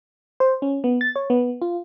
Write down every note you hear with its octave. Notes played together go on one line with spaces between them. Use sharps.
C5
C#4
B3
A6
C#5
B3
F4